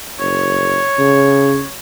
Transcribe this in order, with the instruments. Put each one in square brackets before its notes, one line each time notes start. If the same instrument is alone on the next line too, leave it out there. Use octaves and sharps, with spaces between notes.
[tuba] F#1 [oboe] C#5
[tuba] C#3